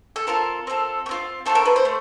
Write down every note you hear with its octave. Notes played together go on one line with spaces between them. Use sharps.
A4
C4 F4 A4 A#4
C4 F4 A4
A3
C4 F4
A3 C4 F4 A4
A#4
B4
C5
A3